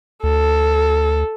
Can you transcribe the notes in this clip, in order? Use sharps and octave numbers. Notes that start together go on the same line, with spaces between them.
D2 A4